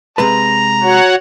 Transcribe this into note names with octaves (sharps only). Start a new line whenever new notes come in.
C3 G#3 B4 A#5
F#4 C#5 F#5